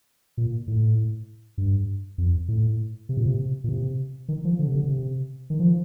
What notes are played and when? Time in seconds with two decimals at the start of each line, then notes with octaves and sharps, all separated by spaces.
0.37 A#2
0.68 A2
1.58 G2
2.18 F2
2.48 A2
3.09 C3
3.17 A#2
3.26 C3
3.64 A#2
3.69 C3
4.28 D#3
4.45 F3
4.59 D3
4.67 C3
4.75 D3
4.89 C3
5.50 D#3
5.59 F3